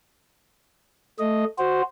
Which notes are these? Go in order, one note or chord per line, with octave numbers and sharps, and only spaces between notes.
A3 D#5
F#4 C5